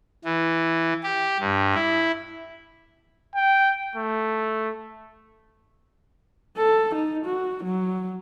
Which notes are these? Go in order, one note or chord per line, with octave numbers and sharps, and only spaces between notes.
E3
G4
G2
E4
G5
A3
A4
D#4
F#4
F#3